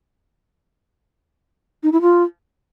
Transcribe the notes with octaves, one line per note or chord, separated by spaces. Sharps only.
D#4
E4
F4